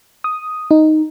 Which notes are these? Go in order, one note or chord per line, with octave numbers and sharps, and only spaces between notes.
D#6
D#4